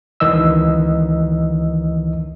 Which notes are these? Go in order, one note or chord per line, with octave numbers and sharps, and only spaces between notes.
C#2 D#3 E3 D#5 E6